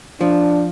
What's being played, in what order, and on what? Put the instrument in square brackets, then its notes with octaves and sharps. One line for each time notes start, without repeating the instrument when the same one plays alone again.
[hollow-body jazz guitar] F3 [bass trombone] D4